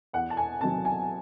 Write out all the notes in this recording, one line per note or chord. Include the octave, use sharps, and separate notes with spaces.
E2 F#5
A5
G#5
C3 D#3 F#3 A5
G#5